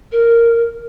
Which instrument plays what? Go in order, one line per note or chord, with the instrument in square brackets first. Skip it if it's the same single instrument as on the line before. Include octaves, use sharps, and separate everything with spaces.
[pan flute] A#4